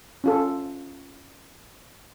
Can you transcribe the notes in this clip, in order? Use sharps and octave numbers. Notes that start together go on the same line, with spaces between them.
C#4 F4 A4